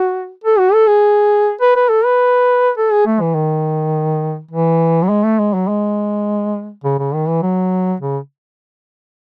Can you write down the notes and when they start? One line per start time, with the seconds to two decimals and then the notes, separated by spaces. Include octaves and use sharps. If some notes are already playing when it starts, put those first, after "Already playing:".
Already playing: F#4
0.44 A4
0.59 F#4
0.74 A4
0.87 G#4
1.61 B4
1.76 B4
1.89 A4
2.05 B4
2.78 A4
2.92 G#4
3.06 A3
3.21 E3
3.35 D#3
4.51 E3
5.03 F#3
5.09 G#3
5.24 A3
5.39 G#3
5.54 F#3
5.68 G#3
6.84 C#3
6.99 C#3
7.14 D#3
7.28 E3
7.43 F#3
8.00 C#3